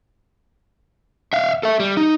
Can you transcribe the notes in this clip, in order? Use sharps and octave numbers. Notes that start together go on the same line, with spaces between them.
E5 F5
A4 E5
G3
D#4